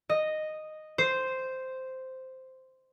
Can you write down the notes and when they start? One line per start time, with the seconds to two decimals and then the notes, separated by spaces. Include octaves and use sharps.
0.09 D#5
0.98 C5